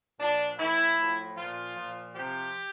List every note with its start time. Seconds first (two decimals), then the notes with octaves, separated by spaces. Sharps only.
0.20 A#2 F3 D4
0.58 A2 E3 E4
0.98 A2 F3
1.36 F3 F4
1.42 A#2
1.76 A#2 F3
2.15 C3 F3 G4